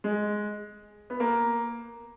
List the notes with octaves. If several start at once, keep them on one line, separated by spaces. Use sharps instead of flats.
G#3
B3
A#3